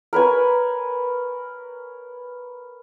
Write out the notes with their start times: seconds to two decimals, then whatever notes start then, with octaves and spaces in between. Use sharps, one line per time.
0.13 A#4 B4 C#5 G#5